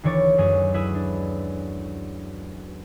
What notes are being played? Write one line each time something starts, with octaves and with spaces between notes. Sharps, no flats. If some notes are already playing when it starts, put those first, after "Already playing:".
D2 D#3 E3 C#5 D6 A6
F#2 G#3 G#4
E4 G#4 B4 E5
D4